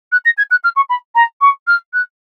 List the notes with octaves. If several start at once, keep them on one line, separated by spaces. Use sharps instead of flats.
F#6
A#6
G#6
F#6
F6
C#6
B5
A#5
C#6
F6
F#6